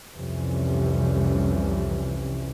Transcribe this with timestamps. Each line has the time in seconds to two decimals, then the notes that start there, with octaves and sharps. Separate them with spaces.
0.16 C2 F2 C3 E3 G3 C#4